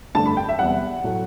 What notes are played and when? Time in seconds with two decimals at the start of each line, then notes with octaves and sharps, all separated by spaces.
0.15 G2 D3 A3 A5
0.26 B5
0.37 G5
0.49 E5
0.59 E2 C3 G3 F#5
1.04 A2 F#3 A3